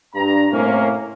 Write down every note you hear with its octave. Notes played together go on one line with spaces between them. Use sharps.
G2 A#5
A2 C3 A#3 C#4